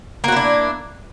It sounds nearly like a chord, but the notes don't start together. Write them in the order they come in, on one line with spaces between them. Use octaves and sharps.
A#3 F#4 E4 D4